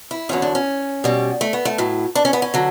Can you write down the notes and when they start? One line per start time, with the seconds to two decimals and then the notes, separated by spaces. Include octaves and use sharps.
0.11 E4
0.29 E2 D3 F#3 C#4
0.42 D4
0.55 C#4
1.04 B2 G3
1.41 A3
1.53 B3
1.65 A3
1.78 A2 F#3
2.15 D4
2.25 C#4
2.33 B3
2.42 C#4
2.54 D3 F#3